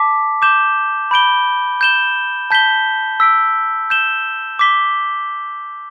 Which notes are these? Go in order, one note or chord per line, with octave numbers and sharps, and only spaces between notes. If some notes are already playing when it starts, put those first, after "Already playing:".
Already playing: A5 D6 B6
D6 G6 E7 G7
B5 G6 D7 G7
G6 E7 G7
A5 G6 B6 G7
E6 B6 D7
G6 E7 G7
D6 B6 G7